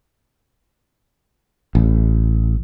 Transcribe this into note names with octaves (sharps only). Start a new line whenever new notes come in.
A1